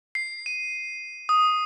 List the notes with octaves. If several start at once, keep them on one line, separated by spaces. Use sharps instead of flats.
C7
D#7
D#6